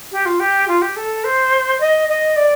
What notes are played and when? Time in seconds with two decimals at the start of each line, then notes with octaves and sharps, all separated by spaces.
0.12 G4
0.26 F4
0.40 G4
0.68 F4
0.82 G4
0.96 A4
1.24 C5
1.80 D#5
2.09 D#5
2.36 D5